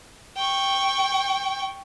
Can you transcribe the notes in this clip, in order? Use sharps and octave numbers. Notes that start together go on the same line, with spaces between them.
G5 C#6